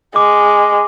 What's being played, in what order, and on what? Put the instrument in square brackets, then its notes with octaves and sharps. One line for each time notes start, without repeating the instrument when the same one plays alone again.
[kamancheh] G#3 [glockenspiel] D6